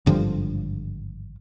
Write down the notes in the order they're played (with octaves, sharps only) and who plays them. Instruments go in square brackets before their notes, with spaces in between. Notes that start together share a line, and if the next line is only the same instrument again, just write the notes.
[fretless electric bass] G#1 G2 D3 F3